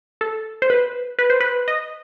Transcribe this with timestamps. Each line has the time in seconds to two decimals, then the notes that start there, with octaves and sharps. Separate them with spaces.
0.21 A4
0.62 C5
0.70 B4
1.19 B4
1.30 C5
1.40 B4
1.68 D#5